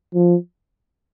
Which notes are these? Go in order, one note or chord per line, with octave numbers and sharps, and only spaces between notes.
F3